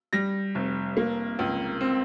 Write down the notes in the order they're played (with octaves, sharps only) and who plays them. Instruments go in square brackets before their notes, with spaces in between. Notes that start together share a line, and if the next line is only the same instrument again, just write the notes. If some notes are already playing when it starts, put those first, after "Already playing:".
[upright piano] G3 A#6
F1
A#3
C#2
C4